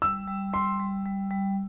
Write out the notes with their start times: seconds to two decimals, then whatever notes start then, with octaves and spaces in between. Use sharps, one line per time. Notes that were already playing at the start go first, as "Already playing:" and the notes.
0.02 G3 E6
0.27 G3
0.53 G3 C6
0.80 G3
1.05 G3
1.30 G3